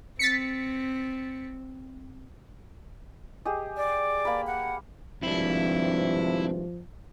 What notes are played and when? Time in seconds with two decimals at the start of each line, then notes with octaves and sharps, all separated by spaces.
0.19 C4 A6 B6 C#7
3.45 G4 G#4 D#5
3.77 D5
4.25 A#3 B5
4.47 F#5
5.23 G#1 G2 C3 F3 C4 D4 E4